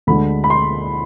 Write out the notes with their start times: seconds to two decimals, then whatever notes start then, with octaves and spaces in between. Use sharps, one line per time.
0.07 D2 D3 G#3 B5
0.44 B5
0.50 C6